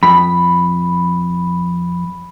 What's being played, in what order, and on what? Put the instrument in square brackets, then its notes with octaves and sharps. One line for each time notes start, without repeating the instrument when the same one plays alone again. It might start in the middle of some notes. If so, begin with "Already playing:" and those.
[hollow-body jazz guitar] F2 [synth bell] B5